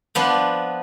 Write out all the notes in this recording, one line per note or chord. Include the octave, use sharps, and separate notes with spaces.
F3 B3 D4